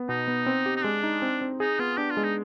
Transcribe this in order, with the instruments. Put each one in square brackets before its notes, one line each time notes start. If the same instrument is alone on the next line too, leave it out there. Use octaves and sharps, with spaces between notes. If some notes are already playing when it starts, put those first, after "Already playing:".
Already playing: [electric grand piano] B3
[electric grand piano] B2 [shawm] D#4
[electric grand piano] B3
C4
G4
[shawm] D#4
[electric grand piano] G#3 [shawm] D4
[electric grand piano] D#4
C4
C4
[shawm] D#4 [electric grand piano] G#4
[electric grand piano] B3 [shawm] F4
[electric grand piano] D4 [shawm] G4
[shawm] F4
[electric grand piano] G#3
[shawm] D#4